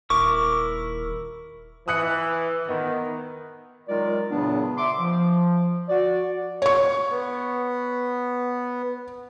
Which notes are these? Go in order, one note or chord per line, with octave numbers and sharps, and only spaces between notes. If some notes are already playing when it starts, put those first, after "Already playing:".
D#1 E4 A#4 C#6 D6
E3 D#6 F#6 C#7
D#3 B3
D#3 F#3 G#3 F4 A#4 D5
E2 A#2 C#3 F#3 B3 D4
E5 C6 D6
F3
F#4 D5
C#5 C#6
B3